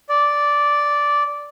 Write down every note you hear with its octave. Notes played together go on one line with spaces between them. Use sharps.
D5